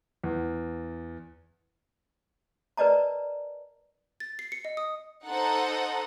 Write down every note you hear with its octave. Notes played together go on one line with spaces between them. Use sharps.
E2
A#4 B4 D5 D#5 A5 A#5
A6
C7
C#7
D#5
D#6
D#4 A4 C5 F#5